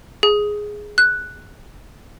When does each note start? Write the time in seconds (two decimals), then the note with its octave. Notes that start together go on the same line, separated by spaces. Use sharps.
0.23 G#4
0.98 F#6